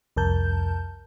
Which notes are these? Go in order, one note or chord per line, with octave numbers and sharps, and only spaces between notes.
C2 F2 A#4 A5 G6